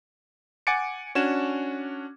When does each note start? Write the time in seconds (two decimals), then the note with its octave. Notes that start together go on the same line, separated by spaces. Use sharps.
0.67 F#5 G#5 D6 A6 C#7 D7
1.15 C#4 D4 F#4 G#6 E7